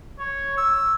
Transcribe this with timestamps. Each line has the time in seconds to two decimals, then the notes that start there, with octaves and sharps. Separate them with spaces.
0.19 C#5
0.57 E6